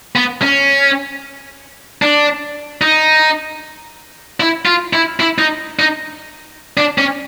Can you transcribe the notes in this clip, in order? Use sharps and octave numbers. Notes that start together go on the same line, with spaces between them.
B3
C#4
D4
D#4
E4
F4
E4
E4
D#4
D#4
D4
C#4